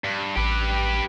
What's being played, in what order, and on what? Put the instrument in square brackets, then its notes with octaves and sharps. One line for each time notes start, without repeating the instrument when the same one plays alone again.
[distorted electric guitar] G2
[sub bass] A1 [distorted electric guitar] G4 B4